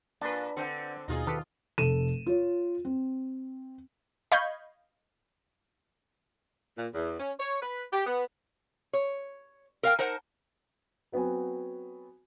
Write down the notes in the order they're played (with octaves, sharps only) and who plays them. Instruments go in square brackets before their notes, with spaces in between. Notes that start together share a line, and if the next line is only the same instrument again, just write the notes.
[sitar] A#2 [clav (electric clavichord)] D4 B4
[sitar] D3 C4 [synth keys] F#5 G6 C#7
[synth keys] D#2 B2 [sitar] D#4 F4 G#4
[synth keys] D#3 [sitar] F4 [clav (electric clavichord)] G4 A4 B4
[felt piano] F1 A4 D#7 E7
F4 C#5
C4
[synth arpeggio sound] D#5 F5 B5 C#6 G6 G#6
[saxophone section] A#2
E2
C#4
C#5
B4
G4
B3
[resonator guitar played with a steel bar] C#5
A#4 F5 G5
D#4 A#4 C5 F#5 A5
[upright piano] F#3 B3 C4 F#4 G#5